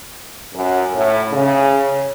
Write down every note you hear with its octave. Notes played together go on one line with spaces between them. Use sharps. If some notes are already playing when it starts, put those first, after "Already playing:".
F#2
A2
C#3